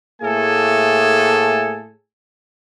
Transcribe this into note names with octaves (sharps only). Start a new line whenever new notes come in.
A2 A3 A#3 G#4 A4 G#5